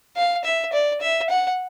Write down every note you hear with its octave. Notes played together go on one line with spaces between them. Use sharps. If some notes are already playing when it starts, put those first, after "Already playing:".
F5
E5
D5
E5
F#5